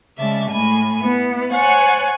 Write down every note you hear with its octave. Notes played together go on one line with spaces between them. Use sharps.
C#3 G#3 D5 E5 A5
A2 G#5 B5
B3 E4
C5 C#5 F#5 G#5 F#6 A6